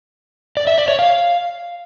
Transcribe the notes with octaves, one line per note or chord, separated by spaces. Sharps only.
D5
E5
D5
C#5
F5